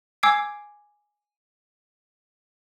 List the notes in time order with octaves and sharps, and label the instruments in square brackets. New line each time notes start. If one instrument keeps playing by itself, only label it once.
[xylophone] G#5 D6 E6 G#6 C7 D7